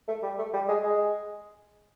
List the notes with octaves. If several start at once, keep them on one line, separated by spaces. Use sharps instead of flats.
A3
G3
A3
G3
G#3
G#3